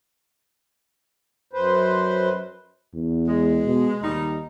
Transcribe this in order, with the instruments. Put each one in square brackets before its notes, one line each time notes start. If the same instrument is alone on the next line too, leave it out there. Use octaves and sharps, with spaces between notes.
[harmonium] F#2 B4 C5
[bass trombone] E2
[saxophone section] G#3
[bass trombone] B2
[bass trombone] D#2 [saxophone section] G3 D#4